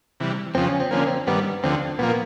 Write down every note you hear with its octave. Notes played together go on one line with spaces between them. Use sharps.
C3 E3 G3
F2 C#3 F3 C4
C#4
C4
D3 F3 A#3 C#4
C4
G2 D#3 G3 B3
D2 D3 F3 C4
A#2 F3 A#3 B3